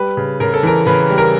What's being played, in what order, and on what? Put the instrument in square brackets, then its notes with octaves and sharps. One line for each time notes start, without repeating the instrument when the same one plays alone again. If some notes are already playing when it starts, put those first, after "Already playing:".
Already playing: [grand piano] G3 B4
C#3
C#3 A#4
A4
E3 A#4
C#3 B4
G3
A#4